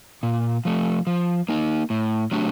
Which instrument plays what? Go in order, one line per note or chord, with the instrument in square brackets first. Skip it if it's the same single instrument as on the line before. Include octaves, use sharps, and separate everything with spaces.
[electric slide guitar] A#2
F3 A3
F3
A#3 D#4
A2
F#3 A3 D4 G4